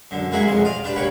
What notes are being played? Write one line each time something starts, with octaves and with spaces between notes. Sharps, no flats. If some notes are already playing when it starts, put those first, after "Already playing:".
F#2 D3
G#3 A#3 E4 F#4 G#4
A1 F2 G#3 C6
D5 D#5 F5
D4 G4 B4
G2 A#3 C#5 F#5 G5